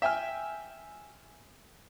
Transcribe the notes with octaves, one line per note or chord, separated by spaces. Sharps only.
E5 G5 G#5 F6